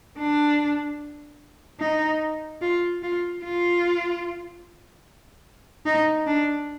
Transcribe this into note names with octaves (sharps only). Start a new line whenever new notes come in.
D4
D#4
F4
F4
F4
D#4
D4